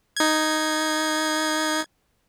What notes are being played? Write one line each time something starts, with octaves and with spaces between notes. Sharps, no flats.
D#4 G#6